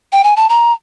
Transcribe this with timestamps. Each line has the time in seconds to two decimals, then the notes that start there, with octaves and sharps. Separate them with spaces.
0.12 G5
0.24 G#5
0.36 A5
0.49 A#5